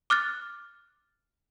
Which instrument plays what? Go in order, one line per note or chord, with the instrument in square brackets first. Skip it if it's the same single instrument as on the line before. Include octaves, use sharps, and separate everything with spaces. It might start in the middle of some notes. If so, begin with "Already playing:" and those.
[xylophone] D6 F6 F#6 A6